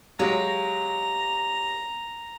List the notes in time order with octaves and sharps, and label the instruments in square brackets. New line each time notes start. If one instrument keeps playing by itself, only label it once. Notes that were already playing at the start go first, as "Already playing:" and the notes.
[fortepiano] F#3 G#3 [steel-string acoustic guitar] G4 C#5 F5 [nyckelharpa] A#5